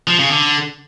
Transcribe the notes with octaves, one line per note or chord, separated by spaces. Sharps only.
F3
C#3
D3